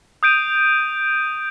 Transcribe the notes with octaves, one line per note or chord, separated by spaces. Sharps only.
D#6 G6 D7 D#7